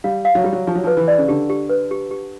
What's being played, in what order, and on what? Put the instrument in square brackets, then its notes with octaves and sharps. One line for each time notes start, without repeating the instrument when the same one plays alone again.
[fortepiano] G3 [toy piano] F5
[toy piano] F5
[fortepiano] F#3
[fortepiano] G3 [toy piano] G4
[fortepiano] F#3
[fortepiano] F3 [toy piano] G4
[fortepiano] F#3
[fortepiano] F3 [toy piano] B4
[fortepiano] E3
[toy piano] D5
[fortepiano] C#3
[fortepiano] D3 [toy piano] G4
[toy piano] G4
B4
G4
G4